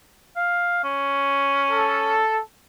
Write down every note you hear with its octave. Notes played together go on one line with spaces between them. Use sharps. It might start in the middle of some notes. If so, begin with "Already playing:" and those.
F5
C#4
A4